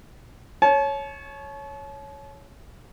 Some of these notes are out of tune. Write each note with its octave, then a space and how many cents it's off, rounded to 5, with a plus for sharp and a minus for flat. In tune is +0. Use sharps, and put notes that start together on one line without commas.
C#5 +0 A5 -40